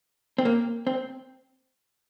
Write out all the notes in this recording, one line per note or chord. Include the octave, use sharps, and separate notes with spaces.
C4
A#3
C4